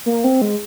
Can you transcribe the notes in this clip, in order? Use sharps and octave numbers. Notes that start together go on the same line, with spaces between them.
A#3
C4
G#3